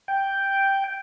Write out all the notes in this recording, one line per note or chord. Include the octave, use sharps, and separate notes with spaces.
G5